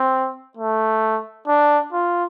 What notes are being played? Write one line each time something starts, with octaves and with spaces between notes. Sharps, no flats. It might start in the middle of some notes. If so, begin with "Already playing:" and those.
Already playing: C4
A3
D4
F4